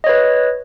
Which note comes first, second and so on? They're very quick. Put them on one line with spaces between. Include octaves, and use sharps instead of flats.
D#5 C#5 B4